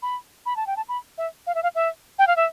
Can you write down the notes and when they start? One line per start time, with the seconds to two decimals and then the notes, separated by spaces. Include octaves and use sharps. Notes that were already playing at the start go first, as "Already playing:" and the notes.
0.02 B5
0.46 B5
0.56 A5
0.67 G5
0.77 A5
0.89 B5
1.18 E5
1.47 F5
1.55 E5
1.63 F5
1.75 E5
2.19 G5
2.27 F5
2.36 E5